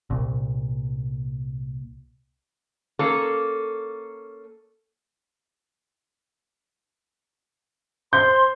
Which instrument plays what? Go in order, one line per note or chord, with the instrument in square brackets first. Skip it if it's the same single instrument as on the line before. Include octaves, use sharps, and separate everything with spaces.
[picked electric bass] C2 A#2
[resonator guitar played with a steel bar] A#3 C#4 A4
[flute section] C5 C6 [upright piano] G6